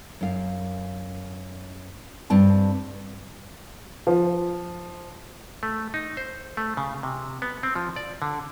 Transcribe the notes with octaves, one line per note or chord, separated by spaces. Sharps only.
F#2 F5
G2 C4 A5
F3
A3
D#4
C5
A3
C#3
C3
B3
C4
F3
D5
D3